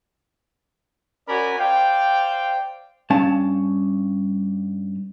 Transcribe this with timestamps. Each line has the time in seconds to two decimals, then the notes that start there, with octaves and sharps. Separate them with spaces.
1.28 C#4 F#4 A#4 D5 G#5 B5
1.58 C5 D5 F5 G5
3.10 G2 C#4 F5 A5